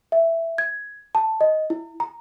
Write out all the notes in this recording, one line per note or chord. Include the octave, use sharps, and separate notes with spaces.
E5
G#6
A5
D#5
E4
A#5